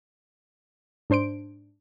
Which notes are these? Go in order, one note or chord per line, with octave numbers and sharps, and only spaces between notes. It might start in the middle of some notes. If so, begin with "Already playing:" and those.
G#2 D4 C5 C6 D7